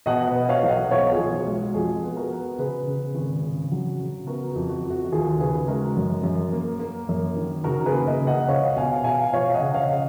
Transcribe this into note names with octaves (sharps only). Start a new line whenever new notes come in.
B2 D#5 F#5
B4 D#5
B3
C#5 F5
B1
D#5 F#5
B1 C#5 F5
F4 G#4
B1
F#4
G#3
F#4
F2 F4 G#4
B3
F#4 A#4
B3
C#3 G#4 B4
C#3
G#1
C#3
F#3
C#3
B3 F#4 A#4
F#4
F2
F#4
F2
F#4
F#4
D#2 F4 G#4
C#3 G#4 B4
G#3 F#4 A#4
F#2
F#2
A#3
A#3
F#2
D#3
C#3 F#4 A#4
G#4 B4
A#3
B4 D#5
C#3
D#5 F#5
C#2 C#5 F5
B2 F5 G#5
B2 F5 G#5
F3 C#5 F5
D#5 F#5
C#3
C#5 F5
C#3